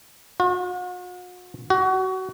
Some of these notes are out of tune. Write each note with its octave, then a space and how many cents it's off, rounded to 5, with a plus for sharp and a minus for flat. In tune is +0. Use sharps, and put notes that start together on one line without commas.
F#4 -45
F#4 +25